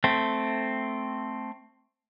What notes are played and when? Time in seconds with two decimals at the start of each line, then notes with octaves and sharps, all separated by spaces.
0.04 A3 C4